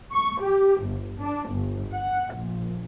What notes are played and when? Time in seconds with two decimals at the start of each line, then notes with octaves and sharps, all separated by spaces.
0.12 C#6
0.41 G4
0.85 G1
1.20 D4
1.51 G1
1.93 F#5
2.35 A#1